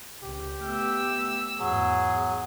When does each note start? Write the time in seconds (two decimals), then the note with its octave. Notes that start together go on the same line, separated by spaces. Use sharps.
0.23 C#2 G4
0.62 A3 B3 E6
1.59 E2 G#2 F#3 G#4